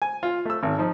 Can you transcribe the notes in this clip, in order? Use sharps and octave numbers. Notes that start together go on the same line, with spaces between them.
G#5
F4
A3 E6
G#1
F3 D#4